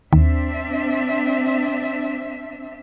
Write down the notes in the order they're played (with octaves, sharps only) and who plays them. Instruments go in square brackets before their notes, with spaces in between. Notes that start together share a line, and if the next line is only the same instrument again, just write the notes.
[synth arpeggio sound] D#2 [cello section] C4 D4 E5